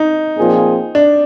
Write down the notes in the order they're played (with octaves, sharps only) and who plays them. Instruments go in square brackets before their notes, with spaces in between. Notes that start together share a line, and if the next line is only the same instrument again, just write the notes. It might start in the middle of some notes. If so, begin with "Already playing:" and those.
Already playing: [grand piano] D#4
[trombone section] A#2 F3 C4 F4 G#4
[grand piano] D4